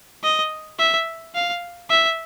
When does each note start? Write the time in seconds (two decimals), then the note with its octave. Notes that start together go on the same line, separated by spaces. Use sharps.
0.24 D#5
0.79 E5
1.35 F5
1.90 E5